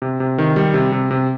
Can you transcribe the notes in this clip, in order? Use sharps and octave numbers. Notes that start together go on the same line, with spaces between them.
C3
C3
D#3
G3
C3
C3
C3